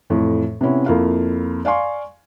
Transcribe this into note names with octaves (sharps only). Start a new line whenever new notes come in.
F2 A2 E3
C3 B3 C#4 E4
F2 A#3 E4 F4 F5
D5 F5 G#5 C6 C#6